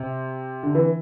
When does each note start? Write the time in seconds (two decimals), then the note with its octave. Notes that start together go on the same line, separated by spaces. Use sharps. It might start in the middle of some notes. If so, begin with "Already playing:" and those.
Already playing: C3
0.63 D3
0.75 E3